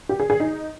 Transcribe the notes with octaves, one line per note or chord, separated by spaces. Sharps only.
G4
G#4
G#4
D#4